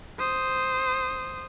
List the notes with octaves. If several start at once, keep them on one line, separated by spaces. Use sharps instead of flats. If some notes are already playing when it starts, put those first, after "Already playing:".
C5 D#6